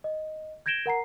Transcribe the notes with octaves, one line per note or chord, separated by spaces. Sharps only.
D#5
G6 G#6 A#6 D7 E7 G7
A#4 F#5 A#5 C7